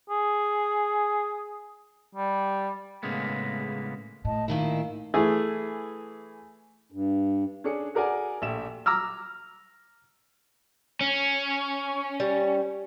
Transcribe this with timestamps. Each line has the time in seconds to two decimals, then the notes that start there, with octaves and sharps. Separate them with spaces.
0.10 G#4
2.16 G3
3.03 A2 C#3 G#3 A#3 B3
4.25 A2 D#5 A5
4.48 A#2 D#3 D#4 E4 F5
5.14 E3 A3 G#4
6.92 G2
7.64 C#4 D4 G#4 C#7
7.95 F#4 G#4 A#4 D5 F#5 G#5
8.42 A#1 A3 G4 E5 E7
8.86 A#5 D6 E6 F6
11.01 C#4
12.20 G3